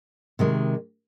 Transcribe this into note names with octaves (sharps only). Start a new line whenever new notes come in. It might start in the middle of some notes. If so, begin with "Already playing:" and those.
C3 D#3 G#3